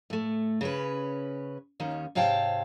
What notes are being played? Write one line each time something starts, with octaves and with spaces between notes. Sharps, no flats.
A2 A3
C#3 C#4 B4
D#2 D#3 C#4
G#2 C3 C#5 F5 G5 A5